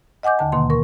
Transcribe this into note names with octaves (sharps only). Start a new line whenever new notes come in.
D#5 F#5 G#5 D6 G6
D#2 D3 A5
D2 B2 D#3 A#3 C6
A#4 C#6